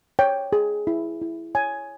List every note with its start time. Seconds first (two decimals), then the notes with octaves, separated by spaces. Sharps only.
0.19 C#5 G5
0.53 G#4
0.87 E4
1.22 E4
1.55 C#5 G#5